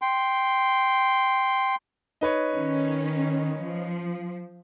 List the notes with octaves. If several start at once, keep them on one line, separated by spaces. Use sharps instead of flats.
G5 C6
D#4 B4 C#5
D#3 C#4
F3